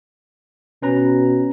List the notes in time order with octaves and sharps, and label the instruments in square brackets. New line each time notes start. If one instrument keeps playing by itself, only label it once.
[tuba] B2 [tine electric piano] C#4 B4 A#5